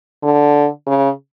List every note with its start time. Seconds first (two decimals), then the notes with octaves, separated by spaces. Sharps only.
0.23 D3
0.87 C#3